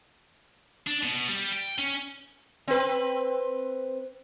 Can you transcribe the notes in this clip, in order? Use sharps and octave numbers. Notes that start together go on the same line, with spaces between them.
D4
B2
G3
G5
C#4
C4 B4